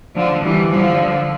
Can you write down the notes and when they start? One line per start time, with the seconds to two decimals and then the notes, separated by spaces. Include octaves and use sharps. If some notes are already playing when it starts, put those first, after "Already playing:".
0.15 D3 F3
0.43 E3 G3
0.72 D3 F3